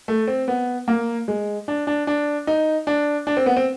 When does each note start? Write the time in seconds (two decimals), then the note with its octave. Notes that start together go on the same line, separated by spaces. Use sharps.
0.08 A3
0.28 C4
0.48 B3
0.88 A#3
1.28 G#3
1.68 D4
1.87 D4
2.07 D4
2.47 D#4
2.87 D4
3.27 D4
3.37 C4
3.46 B3
3.57 C4